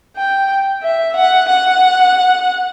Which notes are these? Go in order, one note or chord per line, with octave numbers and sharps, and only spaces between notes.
G5
E5
F#5
F#5